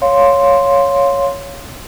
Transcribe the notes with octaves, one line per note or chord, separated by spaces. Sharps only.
C#5 F5 C6